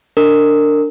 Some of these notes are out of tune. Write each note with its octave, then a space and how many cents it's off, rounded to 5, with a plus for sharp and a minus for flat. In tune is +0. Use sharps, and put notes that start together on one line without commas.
D4 +0 A#4 -30